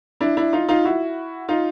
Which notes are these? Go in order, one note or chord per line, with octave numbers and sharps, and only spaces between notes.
D4 E4
D4 E4
D#4 F4
D#4 F4
E4 F#4
D#4 F4